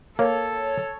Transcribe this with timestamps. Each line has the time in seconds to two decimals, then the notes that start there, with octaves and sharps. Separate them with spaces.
0.19 A#3 A4 C#5